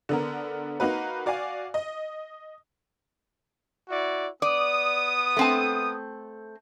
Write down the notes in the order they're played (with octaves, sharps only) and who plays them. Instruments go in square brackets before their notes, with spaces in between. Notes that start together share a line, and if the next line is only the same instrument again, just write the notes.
[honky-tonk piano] D3 B3 A#4
A#3 D#4 F#4 B4
F#4 D5 F5 G#5
D#5
[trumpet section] E4 F#4 D5
[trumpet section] B3 D#6 [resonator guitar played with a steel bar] D5
[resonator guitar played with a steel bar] A3 C4 A5